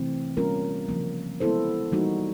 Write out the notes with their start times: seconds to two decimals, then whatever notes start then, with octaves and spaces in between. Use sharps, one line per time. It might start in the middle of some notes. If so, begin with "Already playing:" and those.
Already playing: C3 E3 A3 C4
0.37 G3 A#3 C#4 F4 A#4
0.88 C#3 F3 A#3
1.40 G#3 B3 E4 A4 C5
1.92 E3 G3 A#3 D#4 F#4